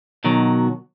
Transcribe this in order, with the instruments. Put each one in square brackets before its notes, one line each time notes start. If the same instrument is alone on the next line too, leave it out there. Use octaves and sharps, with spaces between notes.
[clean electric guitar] B2 D#3 F#3